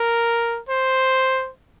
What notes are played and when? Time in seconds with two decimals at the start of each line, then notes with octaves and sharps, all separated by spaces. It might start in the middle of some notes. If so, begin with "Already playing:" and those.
Already playing: A#4
0.69 C5